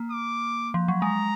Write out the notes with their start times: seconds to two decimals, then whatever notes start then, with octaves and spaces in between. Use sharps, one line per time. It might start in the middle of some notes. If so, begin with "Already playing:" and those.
Already playing: A#3
0.11 D6
0.74 F3
0.88 F#3
1.02 G#3 A#5